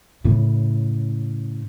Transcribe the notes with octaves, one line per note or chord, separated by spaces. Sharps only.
A2 C#3